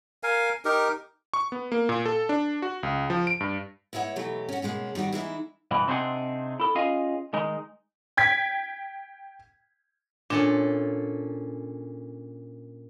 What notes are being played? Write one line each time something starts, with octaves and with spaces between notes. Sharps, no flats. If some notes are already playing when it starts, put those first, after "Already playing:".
A#4 F5 G#5
D#4 G4 A#4
C#6
B3
A#3
A#2
A4
D4
F#4
C#2
F3
D7
G2
G#3 B3 E4 C#5 F#5
B2 E3 F#3 A3 G4
C#4 F#4
B2 G#3 A#3 C#4
D#3 G3 B3 F#4 D5
E3 G#3 D#4 E4
G2 B2 E3
C3 C4 D4 D#4 G#4 F#5
E4 A4
C#4 F4 G#4 D#5 F5 G#5
D#3 G#3 D#4
G5 G#6 B6
A#2 C#4 D4 A4